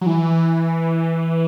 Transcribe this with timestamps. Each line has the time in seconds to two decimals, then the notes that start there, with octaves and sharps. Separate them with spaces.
0.01 F#3
0.06 E3